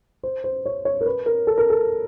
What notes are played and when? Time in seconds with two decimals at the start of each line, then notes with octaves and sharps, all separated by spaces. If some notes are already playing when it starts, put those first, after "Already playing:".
0.23 C5
0.44 C5
0.66 C#5
0.85 C#5
1.01 A#4
1.06 B4
1.26 A#4
1.47 A4
1.58 A#4
1.70 A4